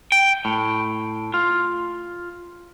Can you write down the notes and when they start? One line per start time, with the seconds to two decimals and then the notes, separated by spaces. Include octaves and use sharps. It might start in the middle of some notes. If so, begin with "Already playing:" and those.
0.12 G5
0.45 A2
1.34 F4